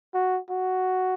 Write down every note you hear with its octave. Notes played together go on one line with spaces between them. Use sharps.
F#4
F#4